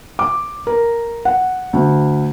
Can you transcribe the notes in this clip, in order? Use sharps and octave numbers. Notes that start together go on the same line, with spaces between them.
D6
A#4
F#5
D2